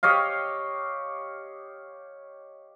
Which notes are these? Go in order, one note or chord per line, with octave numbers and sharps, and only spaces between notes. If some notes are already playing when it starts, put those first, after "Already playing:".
G4 C#5 D#5 F5